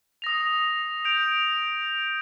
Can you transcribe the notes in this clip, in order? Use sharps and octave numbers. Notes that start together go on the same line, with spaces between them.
D#6 A#6 F7
G6 D7 F7